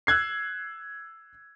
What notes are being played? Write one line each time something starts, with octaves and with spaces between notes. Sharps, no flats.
E6 F#6 G#6 C7